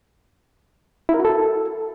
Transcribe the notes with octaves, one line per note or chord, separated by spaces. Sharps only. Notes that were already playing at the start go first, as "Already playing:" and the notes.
E4
A#4
F#4
A4